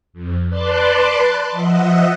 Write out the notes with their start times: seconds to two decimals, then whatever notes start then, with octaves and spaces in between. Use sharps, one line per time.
0.13 F2
0.48 B4 D5 A5 C6 D6 F#6
1.51 F3 D#5 E5 F#5